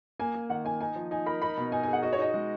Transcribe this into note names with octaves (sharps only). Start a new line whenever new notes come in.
A#3 G#5
A#3
D#3 F#5
D#3 G#5
D#4 G#5
F3
D#4 G#5
A#4 B5
D#4 B5
B2
D#4 G#5
G#5
G#4 F#5
F#4 D#5
C#5
D#4 D#5
G#3